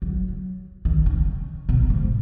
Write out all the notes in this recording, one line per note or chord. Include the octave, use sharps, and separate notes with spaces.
F#3
D#3
C#3
B2
G#2